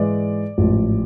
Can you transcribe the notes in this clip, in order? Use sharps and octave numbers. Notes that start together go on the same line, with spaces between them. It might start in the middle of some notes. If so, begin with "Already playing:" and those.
Already playing: G#2 E3 G#3 D5
A1 G#2 F3